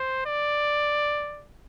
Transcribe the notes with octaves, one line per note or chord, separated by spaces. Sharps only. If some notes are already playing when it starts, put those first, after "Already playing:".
Already playing: C5
D5